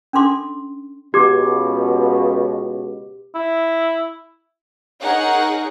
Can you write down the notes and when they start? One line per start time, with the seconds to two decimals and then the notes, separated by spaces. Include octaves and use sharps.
0.13 C#4 D4 A4 C6 D6
1.14 C#2 B2 G4 D6
3.35 E4
5.01 D#4 G#4 A#4 C#5 F#5